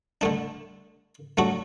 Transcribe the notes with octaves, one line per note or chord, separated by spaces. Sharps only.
D3 A3 D4
F#3 A3 D4 F#4